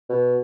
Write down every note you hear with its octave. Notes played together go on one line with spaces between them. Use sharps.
B2